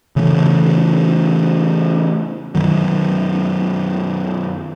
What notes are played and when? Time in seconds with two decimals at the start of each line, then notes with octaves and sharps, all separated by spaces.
0.16 C#3 E3 A3
2.55 F#2 D#3 F#3